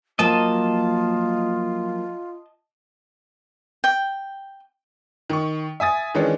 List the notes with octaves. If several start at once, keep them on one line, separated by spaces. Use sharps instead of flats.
F3 F#3 A#3 F4 D#5 A5
G5
D#3 C#6
E5 G#5 D#6 A6
D#3 E3 G#3 C#4 D4